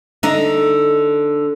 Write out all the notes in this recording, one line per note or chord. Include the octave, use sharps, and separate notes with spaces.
D3 D#4